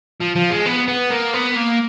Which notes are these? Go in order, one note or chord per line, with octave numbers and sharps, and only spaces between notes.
F3
F3
G#3
B3
B3
A#3
B3
A#3